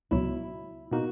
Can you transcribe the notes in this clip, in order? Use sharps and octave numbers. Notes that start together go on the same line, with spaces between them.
C#2 B2 F#3 E4
B2 A#3 D#4 F#4